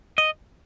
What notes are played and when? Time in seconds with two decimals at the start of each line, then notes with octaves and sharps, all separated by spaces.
0.18 D#5